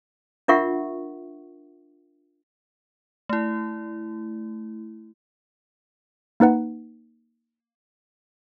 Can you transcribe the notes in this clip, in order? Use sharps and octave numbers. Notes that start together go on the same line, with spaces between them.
D4 F4 A#4 E5 F#5 C#6
A3 E4
A#3 D#4 B4 F#5